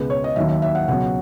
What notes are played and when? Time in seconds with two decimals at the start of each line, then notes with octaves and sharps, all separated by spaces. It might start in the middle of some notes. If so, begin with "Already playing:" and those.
Already playing: C#2 B2 G#3 B4
0.10 C#5
0.24 D#5
0.36 D#2 D#3 F#3 E5
0.48 E5
0.62 E5
0.75 F#5
0.88 C#2 B2 F#3 F#5